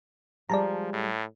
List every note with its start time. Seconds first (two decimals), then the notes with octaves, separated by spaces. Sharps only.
0.50 F3 G3 G#3 D5 A5 A#5
0.93 A2